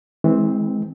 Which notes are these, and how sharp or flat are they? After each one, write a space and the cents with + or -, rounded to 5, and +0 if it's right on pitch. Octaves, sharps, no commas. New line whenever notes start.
E3 -30 G#3 +15 C4 +0